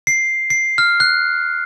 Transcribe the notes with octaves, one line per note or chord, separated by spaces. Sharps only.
C7
C7
F6
F#6